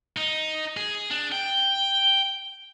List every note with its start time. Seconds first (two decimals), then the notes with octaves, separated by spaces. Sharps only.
0.17 D#4
0.77 G#4
1.11 D4
1.32 G5